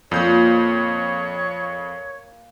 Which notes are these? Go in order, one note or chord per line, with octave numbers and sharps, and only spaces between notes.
F2 A#2 C#5 G6